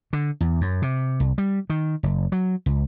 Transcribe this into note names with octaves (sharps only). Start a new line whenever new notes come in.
D3
E2
F#2
C3
C2
G3
D#3
F#1
F#3
C#2